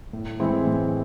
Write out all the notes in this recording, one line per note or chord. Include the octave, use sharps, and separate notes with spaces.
A2
E3 G#3 C4 E4
A2